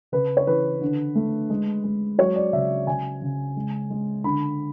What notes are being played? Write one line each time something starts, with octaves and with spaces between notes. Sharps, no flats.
C#3 B4
C#5
E3 B4
D3
A3
G#3
G#3
F#3 C#5
D5
C#3 E5
C#3 G#5
C#3
G#3
G#3
D3 B5